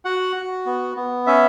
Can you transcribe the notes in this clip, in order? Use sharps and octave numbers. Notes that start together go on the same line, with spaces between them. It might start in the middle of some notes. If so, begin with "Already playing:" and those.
F#4 F#5
F#4
B3
B3
C#4 E5